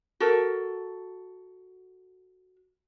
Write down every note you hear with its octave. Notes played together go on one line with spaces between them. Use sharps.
F#4 A4 A#4